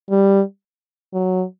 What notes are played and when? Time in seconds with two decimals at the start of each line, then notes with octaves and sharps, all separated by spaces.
0.10 G3
1.13 F#3